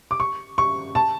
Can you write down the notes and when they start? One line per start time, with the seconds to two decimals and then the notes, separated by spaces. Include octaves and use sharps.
0.11 D6
0.20 C#6
0.58 C#6
0.95 A5